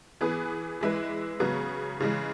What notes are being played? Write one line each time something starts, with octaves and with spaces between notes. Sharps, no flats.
E3 B3 G#4 B4
E3 G#3 E4 B4
C#3 F#3 B3
C#3 E3 G#3